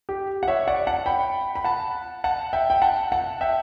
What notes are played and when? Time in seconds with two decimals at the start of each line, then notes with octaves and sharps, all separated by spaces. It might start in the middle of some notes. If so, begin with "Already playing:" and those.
0.09 G4
0.43 F#5
0.48 C#5 E5
0.67 D5 F#5
0.87 F#5 A5
1.06 G5 B5
1.55 B5
1.64 F#5 A5
2.24 F#5 A5
2.53 E5 G5
2.70 G5
2.82 F#5 A5
3.12 F#5 A5
3.41 E5 G5